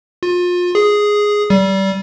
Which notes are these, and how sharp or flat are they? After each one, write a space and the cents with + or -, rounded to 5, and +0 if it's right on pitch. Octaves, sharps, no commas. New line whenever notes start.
F4 +30
G#4 +0
G3 -25